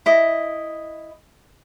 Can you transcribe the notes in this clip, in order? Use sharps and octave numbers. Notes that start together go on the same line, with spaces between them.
E4 D#5